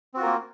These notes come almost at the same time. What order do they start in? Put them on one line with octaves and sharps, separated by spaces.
C4 F#4 F4 A#4 A#3